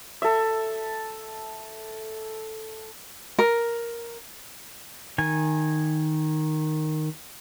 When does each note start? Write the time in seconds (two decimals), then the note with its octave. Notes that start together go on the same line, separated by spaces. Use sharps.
0.22 A4 E5
3.39 A#4
5.18 D#3 G#5